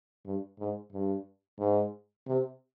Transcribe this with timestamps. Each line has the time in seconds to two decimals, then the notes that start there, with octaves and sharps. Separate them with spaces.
0.25 G2
0.59 G#2
0.92 G2
1.59 G#2
2.27 C3